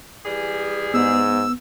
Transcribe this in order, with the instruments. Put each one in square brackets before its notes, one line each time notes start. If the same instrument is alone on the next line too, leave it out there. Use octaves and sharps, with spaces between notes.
[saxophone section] E3 G3 G#4
[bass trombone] G#2 [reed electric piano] B3 [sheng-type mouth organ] E6